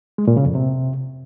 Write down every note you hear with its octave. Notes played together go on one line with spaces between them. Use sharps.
G#3
A#2
C#3
F2
C3